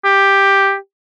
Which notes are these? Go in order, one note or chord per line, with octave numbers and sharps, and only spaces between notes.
G4